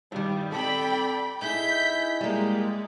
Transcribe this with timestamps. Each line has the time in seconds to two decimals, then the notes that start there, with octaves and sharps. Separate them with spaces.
0.12 G2 D#3 G3
0.52 C4 A4 D5 G5 B5
1.42 D#4 E4 G#4 G6 B6
2.21 G3 G#3 A#3